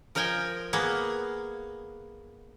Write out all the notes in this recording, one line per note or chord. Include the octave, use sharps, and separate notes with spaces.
F3 A#4 D#5 G5 G#5
A#3 B3 G#4